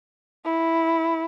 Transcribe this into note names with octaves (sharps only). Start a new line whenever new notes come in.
E4